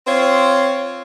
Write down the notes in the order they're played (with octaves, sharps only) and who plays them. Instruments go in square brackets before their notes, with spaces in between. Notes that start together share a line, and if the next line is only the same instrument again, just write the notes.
[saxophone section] C4 F4 C#5